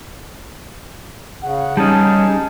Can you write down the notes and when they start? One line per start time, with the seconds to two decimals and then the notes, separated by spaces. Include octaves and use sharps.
1.43 C#3 F#5
1.77 G3 C#4 D#4 G#4 A5